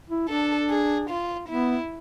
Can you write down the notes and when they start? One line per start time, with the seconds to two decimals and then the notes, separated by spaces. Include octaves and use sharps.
0.10 E4
0.29 D4 A4
0.70 G#4
1.09 F4
1.49 B3 E4